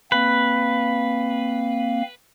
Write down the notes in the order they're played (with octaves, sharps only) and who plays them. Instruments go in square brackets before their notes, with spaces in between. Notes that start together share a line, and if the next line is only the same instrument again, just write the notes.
[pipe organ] A#3 C4 F5 [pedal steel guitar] B4